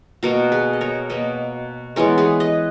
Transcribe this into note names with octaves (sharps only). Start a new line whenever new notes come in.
B2 A#3 F#4 A#4
G#4 B4
D#5
A#4 C#5
B2 A#3 B4 D#5
E3 G#3 B3 A#4 C#5
G#4 B4
B4 D#5